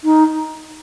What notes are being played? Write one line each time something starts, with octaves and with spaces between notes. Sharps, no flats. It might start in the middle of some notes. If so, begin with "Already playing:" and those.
D#4